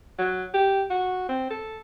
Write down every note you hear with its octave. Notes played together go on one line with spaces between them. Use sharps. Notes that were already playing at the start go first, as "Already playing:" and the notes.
F#3
G4
F#4
C4
A4